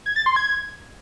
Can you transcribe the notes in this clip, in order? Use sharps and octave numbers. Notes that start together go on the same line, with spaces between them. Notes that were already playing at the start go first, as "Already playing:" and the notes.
G#6
A6
C6
G#6